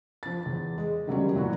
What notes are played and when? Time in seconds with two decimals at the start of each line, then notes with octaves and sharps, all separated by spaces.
0.23 F3 A6
0.46 E2
0.78 G#3
1.07 D#3 F#3 G3 C#4
1.34 A#2 E3 F#3 F#4